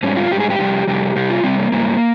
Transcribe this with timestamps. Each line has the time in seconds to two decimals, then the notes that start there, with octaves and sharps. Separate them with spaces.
0.03 G#2 G3 C#4
0.17 F4
0.31 G#2 G3 G4
0.40 G#4
0.50 G4
0.59 F2 C3 G3
0.87 F2 C3 G3 G4
1.16 C3 G3 G4
1.30 F4
1.44 C3 G3 C4
1.58 A#3
1.72 G#2 G3 A#3